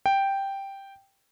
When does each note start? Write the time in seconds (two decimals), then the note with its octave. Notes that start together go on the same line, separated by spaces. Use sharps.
0.06 G5